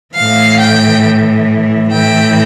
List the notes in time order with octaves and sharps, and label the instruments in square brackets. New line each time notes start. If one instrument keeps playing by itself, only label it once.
[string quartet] A2 E3 F5
G5
A2 E3 G5